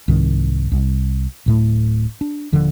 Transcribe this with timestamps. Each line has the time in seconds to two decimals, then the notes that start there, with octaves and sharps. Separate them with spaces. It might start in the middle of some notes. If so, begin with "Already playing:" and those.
0.08 C2 G#2 D#3
0.72 C2
1.46 D1 A2 A3
2.21 D4
2.52 D#1 D3 F3